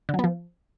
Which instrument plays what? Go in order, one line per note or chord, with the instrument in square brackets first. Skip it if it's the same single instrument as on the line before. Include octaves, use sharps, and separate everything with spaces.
[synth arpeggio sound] D3
F#3
B3
F3